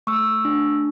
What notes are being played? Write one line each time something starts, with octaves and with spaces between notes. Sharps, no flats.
A3 C#6 E6
D4